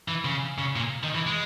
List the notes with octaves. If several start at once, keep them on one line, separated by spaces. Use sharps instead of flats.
E3
C#3
C#3
A#2
D#3
E3
G#3